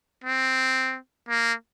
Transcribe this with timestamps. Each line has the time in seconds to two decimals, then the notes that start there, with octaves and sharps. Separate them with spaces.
0.24 C4
1.29 A#3